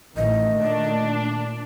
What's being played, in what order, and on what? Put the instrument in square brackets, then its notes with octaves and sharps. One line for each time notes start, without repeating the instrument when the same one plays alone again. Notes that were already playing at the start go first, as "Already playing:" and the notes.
[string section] A1 [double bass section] D#3 A3 [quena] D#5
[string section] A#2 D4